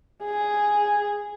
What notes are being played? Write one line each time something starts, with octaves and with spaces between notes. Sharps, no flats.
G#4